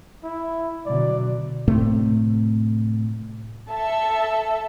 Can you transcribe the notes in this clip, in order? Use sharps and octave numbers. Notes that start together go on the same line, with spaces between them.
E4
B2 D3 F#3 D5
A2 C3 A3
A4 E5 A5